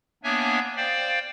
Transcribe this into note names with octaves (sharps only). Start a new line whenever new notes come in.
A#3 B3 D4 C#5 E5 G#5
C5 D5 F5 G5